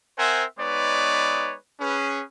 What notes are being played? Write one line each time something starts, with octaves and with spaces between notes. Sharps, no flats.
C4 A#4 C5 E5 F#5 G#5
G#3 B3 D#4 B4 C#5 D5
C#4 G#4 B4